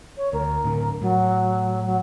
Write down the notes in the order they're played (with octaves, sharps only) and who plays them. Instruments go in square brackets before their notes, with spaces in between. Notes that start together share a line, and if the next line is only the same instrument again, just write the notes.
[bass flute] C#5
[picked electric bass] D2 [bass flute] A#4
[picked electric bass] A2 D3
[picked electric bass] A2 [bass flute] F#3
[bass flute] F#3